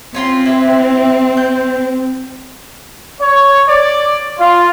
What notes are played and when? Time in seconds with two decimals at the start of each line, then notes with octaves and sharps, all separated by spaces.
0.14 C4 C#4 F4 C6
0.46 E4 G4 B4
1.37 G6
3.21 C#5
3.68 D5
4.40 F4